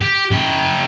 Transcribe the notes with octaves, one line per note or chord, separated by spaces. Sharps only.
G4
C#3 G5